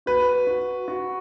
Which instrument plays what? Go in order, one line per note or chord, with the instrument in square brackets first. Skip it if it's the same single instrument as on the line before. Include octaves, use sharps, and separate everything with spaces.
[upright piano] F#4 [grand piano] B4
[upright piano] F#4
F#4